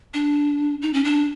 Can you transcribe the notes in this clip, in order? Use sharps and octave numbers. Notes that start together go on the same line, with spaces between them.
D4
D#4
C#4
D4